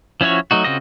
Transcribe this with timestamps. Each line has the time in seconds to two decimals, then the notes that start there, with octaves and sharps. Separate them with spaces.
0.21 F3 C#4 E4 F#4 C#5
0.51 F#3 A3 D#4 F#4
0.64 C#3 C4 F4 F#4 D#5